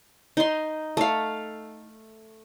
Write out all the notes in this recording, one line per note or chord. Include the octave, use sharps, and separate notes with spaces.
D#4 C6
A3 F5